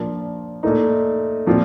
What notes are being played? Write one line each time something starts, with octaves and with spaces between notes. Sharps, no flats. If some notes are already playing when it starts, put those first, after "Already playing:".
Already playing: A#2 F3 A#3 D4
A#2 A3 D#4
A#2 F3 C4 F4